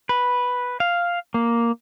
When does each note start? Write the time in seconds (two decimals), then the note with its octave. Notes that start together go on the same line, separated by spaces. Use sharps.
0.09 B4
0.80 F5
1.34 A#3